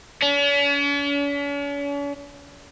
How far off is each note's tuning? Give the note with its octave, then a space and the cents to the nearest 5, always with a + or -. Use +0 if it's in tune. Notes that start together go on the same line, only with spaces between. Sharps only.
C#4 +45